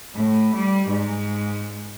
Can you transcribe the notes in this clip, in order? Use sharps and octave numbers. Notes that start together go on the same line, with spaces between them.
A2
G3
G#2